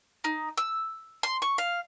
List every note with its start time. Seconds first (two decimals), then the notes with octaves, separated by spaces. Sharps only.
0.24 D#4
0.58 E6
1.23 C6
1.42 C#6
1.58 F5